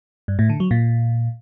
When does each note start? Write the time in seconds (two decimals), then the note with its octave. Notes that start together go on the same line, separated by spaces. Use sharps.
0.28 G2
0.39 A2
0.49 D3
0.60 F#3
0.71 A#2